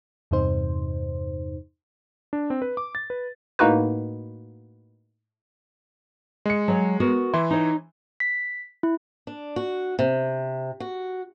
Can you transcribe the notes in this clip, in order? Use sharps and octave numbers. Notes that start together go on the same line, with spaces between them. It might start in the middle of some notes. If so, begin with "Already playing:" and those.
E2 G2 C3 D#4 C5
D4
C4
B4
D6
A6
B4
A2 A#3 D#4 F#4 B4
G#3 C#7
F#3 C#5 G#5
B3 F#4 A#4
E3 E4 C6
D#4 C#5
B6
E4
D4
F#4
C3
F#4